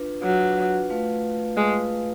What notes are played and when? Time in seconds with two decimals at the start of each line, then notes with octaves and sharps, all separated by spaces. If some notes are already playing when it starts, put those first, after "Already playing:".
Already playing: D4 F4 B4
0.23 F#3 D4 F4 B4
0.90 A3 F4 B4 F5
1.56 G#3 A3 F4 B4 F5